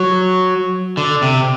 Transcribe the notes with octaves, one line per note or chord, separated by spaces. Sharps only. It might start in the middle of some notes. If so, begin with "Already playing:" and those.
Already playing: F#3
D3
C3